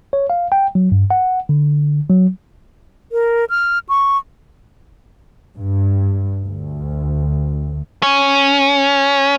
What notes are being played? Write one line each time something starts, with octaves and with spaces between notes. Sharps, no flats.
C#5
F5
G5
F#3
G2
F#5
D3
F#3
A#4
F6
C#6
G2
D2
C#4